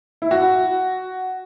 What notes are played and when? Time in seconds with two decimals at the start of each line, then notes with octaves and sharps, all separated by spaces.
0.22 E4
0.31 F#4